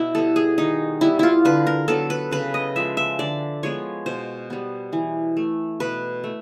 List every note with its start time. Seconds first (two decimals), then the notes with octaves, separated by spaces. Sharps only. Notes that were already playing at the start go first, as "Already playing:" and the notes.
Already playing: B2 E4
0.15 G3 B3 A4
0.36 G#4
0.58 D#3 D#4
1.01 G3 B3 E4
1.19 E4 F4
1.45 D3 B4
1.67 A#4
1.88 F#3 B3 A4
2.10 B4
2.31 C#3 B4
2.54 D#5
2.76 F3 G#3 E5
2.97 E5
3.19 D3 D5
3.63 F3 G#3 B3 C#5
4.06 B2 C5
4.50 G3 B3
4.93 E3
5.37 A3
5.80 B2 B4
6.24 A3